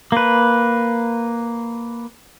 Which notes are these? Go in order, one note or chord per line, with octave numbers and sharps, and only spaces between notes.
A#3 B4